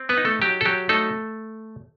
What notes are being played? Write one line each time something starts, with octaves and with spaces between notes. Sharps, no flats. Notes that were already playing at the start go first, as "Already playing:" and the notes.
Already playing: C4
B3 B4
D#4
A3 A4
F#3 G4
A4
F#3 G4
A3 D#4 A4